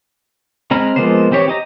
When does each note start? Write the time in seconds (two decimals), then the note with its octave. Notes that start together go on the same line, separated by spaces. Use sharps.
0.71 G#3 C4 A#5 B5 F6
0.96 F3 G#3 A#3 B3 C5
1.31 E3 C4 G4 C#5
1.48 G4 D#5 A#5